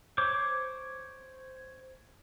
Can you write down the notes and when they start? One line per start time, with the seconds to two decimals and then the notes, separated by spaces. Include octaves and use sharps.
0.18 C5 C#5 D6